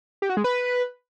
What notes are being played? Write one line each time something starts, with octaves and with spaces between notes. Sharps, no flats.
G4
F#4
G#3
B4